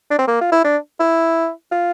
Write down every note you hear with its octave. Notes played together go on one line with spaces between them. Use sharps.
D4
C4
A#3
F4
E4
D4
E4
F4